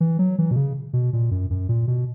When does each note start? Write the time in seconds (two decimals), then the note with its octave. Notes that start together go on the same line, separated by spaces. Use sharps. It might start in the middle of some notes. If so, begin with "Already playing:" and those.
0.01 E3
0.19 F#3
0.39 E3
0.51 B2
0.56 C#3
0.93 B2
1.13 A#2
1.31 F#2
1.50 F#2
1.69 A#2
1.88 B2